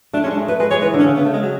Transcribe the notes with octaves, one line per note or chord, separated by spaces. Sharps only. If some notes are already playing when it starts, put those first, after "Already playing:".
A3 D4
G#3 C#4
D4
A3
A3 B4
G#3 B4
G#3 C#5
E3 B4
D3
C#4
C#3
B3
A3
G#3
F#3